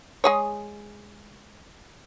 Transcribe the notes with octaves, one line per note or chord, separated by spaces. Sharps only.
G#3 G#4 C#5